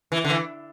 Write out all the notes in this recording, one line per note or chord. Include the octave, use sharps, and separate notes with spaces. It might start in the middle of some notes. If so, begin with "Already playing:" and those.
E3
D3
E3